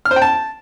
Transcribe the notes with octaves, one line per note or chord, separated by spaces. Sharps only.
F6
C5
G5
A5